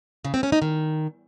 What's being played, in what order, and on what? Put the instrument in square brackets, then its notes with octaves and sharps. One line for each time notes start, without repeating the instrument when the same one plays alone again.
[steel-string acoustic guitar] C#3
C4
C#4
D#4
D#3